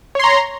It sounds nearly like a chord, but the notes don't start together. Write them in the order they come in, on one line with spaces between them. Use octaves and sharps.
C#5 C6 A#5